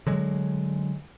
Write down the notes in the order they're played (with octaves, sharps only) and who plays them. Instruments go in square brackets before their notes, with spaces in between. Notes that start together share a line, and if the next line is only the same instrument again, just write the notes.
[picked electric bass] D3 F#3 G#3